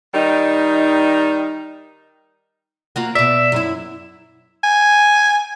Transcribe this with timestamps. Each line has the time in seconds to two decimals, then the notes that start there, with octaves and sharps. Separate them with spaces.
0.14 D#3 G3 D#4
2.96 A#3 F4 F#4
3.15 B2 D5 E5
3.52 F#2 E4
4.64 G#5